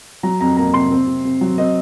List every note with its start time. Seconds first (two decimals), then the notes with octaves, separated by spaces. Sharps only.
0.23 F#3 A#5
0.41 F2 A#5
0.57 A#3 A#5
0.74 C3 C6
0.91 C4
1.07 C3
1.25 C3
1.41 F#3
1.58 C4 D#5